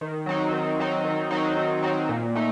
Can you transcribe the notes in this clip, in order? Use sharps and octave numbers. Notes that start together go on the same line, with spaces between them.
D#3
F#3 C4 D#4
D#3
F#3 C4 D#4
D#3
F#3 C4 D#4
D#3
F#3 C4 D#4
A#2
A3 D#4